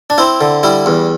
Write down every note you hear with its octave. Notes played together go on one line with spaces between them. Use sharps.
D4
C4 E4
D3
G3 E4
E2